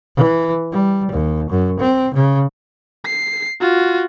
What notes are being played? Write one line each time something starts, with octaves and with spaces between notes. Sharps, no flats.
E3
G3
D#2
F#2
C4
C#3
C7
F4 F#4